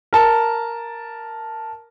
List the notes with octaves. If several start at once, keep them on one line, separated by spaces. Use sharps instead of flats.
A#4 A5